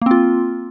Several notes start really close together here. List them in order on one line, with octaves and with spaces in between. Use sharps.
A#3 C4 F4